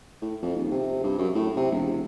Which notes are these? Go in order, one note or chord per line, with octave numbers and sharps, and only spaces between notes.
A2
F2
D#1
C3
G2
F#2
A2
C3
E1